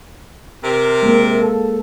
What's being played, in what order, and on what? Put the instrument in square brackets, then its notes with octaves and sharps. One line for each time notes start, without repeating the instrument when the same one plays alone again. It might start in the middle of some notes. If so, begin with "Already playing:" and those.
[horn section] C3 A#4
[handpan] G#3 A#3
[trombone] A4